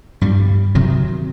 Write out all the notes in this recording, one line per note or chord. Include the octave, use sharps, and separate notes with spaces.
G2 G3
C3 D#3 F#3